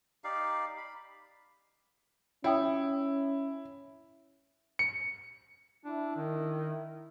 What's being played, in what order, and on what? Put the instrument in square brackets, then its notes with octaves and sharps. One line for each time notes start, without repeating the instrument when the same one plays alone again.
[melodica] D#4 G4 D5 F5
B5
[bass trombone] C#4 [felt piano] E4 [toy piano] C#5 G5 D#6
[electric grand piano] C#7
[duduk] D4 [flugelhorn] E4
[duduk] D#3